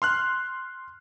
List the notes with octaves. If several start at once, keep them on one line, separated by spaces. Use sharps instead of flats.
C6 F6 F#6